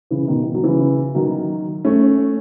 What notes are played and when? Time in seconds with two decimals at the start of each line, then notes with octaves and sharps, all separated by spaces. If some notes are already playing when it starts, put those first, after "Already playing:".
0.11 C#3 E3
0.28 B2 D#3
0.45 E3
0.54 F#3
0.64 C#3 E3
1.15 D#3 F#3
1.85 A3 C#4